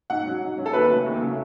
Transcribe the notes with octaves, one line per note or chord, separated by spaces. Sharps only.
G#2 F#5
F#3 C#4
G#2
F#3 C#4
A4
D#2 B4
C#3 F#3 A3
D#2
C#3 F#3 A3